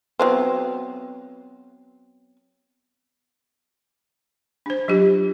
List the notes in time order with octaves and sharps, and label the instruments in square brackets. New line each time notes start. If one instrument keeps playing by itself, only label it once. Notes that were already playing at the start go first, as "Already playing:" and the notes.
[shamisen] F#3 B3 C4
[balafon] D4 C5
F#3 D4 F4 G4